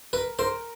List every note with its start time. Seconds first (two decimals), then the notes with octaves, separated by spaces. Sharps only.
0.13 A#4 B4
0.39 A#4 C5